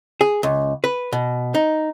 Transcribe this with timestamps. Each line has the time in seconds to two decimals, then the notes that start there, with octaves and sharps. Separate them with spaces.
0.21 G#4
0.43 C#2
0.84 B4
1.12 B2
1.55 D#4